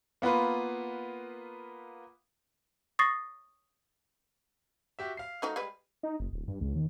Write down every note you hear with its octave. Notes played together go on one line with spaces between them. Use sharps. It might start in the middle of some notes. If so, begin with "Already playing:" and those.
A#3 B3 F4 B4
C#6 D#6 A6 A#6 C7
F#4 G4 E5
F5 C7
A3 D#4 F#4
G3 G#3 B4
D#4
F#1
D1
G2
C#2
D#2